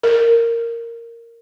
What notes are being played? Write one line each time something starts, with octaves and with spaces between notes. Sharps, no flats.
A#4